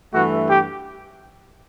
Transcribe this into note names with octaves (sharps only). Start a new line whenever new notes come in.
G2 E3 A3 F#4
G4